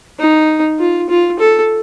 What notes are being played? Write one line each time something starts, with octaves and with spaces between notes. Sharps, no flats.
D#4
F4
F4
A4